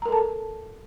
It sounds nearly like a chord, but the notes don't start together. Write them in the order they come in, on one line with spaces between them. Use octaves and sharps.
A#5 A#4 A4 A5